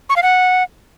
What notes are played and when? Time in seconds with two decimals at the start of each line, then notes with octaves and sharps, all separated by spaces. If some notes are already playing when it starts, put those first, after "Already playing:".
0.09 C#6
0.16 F5
0.23 F#5